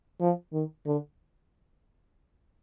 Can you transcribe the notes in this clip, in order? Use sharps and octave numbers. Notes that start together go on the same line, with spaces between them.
F3
D#3
D3